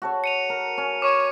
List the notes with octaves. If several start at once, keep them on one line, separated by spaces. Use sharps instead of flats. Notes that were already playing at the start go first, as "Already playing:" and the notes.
F#4 A4 C#5
C#7 D#7 F7
A#4
C#4
C#5 C#6 D6